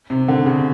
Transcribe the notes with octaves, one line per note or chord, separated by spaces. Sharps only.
C3
D3
C#3